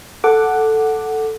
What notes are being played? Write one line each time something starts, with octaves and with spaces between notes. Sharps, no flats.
A4 F#5 D6